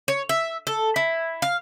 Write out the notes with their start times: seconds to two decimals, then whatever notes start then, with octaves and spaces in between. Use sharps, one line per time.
0.08 C#5
0.29 E5
0.67 A4
0.96 E4
1.42 F5